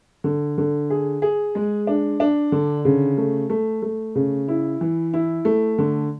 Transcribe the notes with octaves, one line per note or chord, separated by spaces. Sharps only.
D3
D3
G#4
G#4
G#3
D4
D4
D3
C#3
A3
A3
A3
C#3
E4
E3
E4
A3
D3